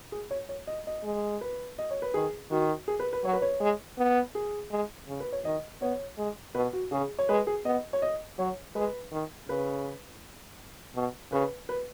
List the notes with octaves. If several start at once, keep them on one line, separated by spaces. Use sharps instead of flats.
G#4
C#5
C#5
D#5
D#5
G#3
B4
D#5
C#5
B4
D#3 G#4
D#3 F#4
G#4
B4
B4
F#3 C#5
B4
C#5
G#3
B3
G#4
G#3
C#3
B4
C#5
D#3 D#5
B3 C#5
G#3
B2 B4
F#4
C#3 G#4
C#5
G#3 B4
G#4
B3 D#5
C#5
D#5
F#3 C#5
G#3 B4
D#3
C#3 B4
B2
C#3 B4
B4